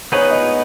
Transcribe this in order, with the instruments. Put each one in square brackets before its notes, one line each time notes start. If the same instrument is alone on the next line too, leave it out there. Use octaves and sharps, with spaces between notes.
[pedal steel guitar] B3 D#4 G#4 B4 [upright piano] C#5
[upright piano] D#5